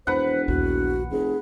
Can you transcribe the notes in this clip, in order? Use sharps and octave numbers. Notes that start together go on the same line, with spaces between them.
E1 F2 B4 C5 F#5
A#1 D#2 F#4
F1 C#4 G#4